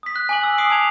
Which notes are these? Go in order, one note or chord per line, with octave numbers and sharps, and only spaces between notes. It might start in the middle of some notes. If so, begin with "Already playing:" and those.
D#6 B6
F#6
G#5 D6 F#7
E6 F#6
D6 D#6 C7 D7
A5 D6 D#6 G#6 F7